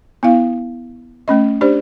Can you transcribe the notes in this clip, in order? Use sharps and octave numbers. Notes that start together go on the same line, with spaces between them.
B3 E4 F5
A3 C#4 D#5
D4 G4 C5 D5